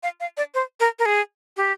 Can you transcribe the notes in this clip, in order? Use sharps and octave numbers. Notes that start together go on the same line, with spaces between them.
F5
F5
D5
C5
A#4
A#4
G#4
G4